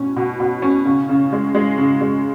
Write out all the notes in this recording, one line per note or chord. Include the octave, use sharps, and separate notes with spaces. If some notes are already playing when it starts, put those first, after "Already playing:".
Already playing: B2 C#4
B2
B2
C#4
C#3
C#3
G#3
G#3
C#3
G#3